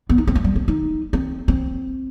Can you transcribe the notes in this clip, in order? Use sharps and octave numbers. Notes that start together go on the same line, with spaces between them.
B3
D#4
C4
A3
G3
C4
D#4
C4
C4